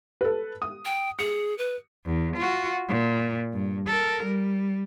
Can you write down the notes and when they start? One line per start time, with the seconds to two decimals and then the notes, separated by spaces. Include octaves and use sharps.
0.21 A4 B4
0.62 D#6
0.85 G5
1.19 G#4 C#7
1.58 B4
2.05 E2
2.36 F4 F#4
2.89 A#2
3.53 G2
3.87 A4 A#4
4.24 G3